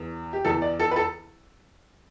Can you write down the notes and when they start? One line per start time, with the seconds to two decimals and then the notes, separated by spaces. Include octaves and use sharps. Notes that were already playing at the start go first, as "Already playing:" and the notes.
Already playing: E2 E3
0.33 G4
0.45 E2 E3 A4
0.62 D5
0.80 A4
0.91 B4
0.96 A4